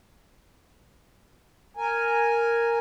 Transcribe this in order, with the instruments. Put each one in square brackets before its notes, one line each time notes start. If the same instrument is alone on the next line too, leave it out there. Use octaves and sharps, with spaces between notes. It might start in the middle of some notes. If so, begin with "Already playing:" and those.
[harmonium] A#4 G#5